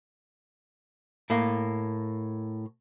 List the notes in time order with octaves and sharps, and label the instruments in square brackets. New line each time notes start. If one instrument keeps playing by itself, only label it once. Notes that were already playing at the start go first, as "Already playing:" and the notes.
[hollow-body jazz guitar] A2 A#3